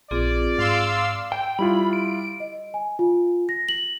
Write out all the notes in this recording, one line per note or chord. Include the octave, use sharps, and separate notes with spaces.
A#1 C4 F4 G#4 D5
G#2 F5 C6 E6
G5
G3 E4 F4 B5
D7
D#5
G#5
F4
A#6
F#7